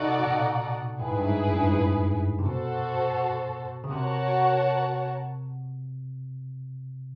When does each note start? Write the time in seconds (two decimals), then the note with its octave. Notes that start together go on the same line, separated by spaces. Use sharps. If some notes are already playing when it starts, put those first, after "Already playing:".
Already playing: C3 D#4 F#4 A4 D5 F#5
0.20 B2
0.27 A#2
1.00 A2 E4 G#4 B4
1.08 G#2
1.17 G2
1.26 G#2
1.48 F#2
1.56 G2
1.64 G#2
1.72 A2
2.39 C3
2.46 B2 F#4 A4 C5
3.84 C#3
3.90 C3 F#4 A#4 C#5 F#5 A5